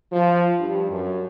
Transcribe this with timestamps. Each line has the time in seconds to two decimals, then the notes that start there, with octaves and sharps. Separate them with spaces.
0.12 F3
0.60 G2
0.90 F#2